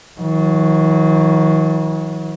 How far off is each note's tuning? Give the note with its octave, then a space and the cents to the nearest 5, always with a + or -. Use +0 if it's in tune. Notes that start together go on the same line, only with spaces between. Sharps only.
D#3 +45 F#3 -25